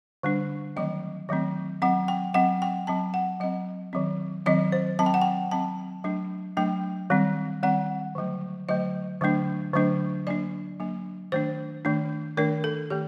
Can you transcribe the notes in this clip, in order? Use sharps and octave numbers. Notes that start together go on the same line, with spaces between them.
D3 G3 D4
D#3 F#3 A3 C4 D#5
D#3 F#3 A3 C4
F#3 C4 F#5
G5
F#3 C4 F#5
G5
F#3 C4 A5
F#5
F#3 C4 D#5
D#3 F#3 C4
D#3 F#3 C4 D#5
C5
F#3 C4 A5
G5
F#5
G5
F#3 C4 A5
F#3 A3 D4
F#3 A3 D4 G5
D#3 G3 C4
D#3 G3 C4 F#5
D3 F#3 A3
D3 F#3 A3 D#5
D3 F#3 A3 D4
D3 F#3 A3 D4
F#3 A#3 D4 D5
F#3 A#3 D4
D#3 A3 D4 C5
D#3 A3 D4
D#3 A3 D4 A#4
A4
D#3 A3 G4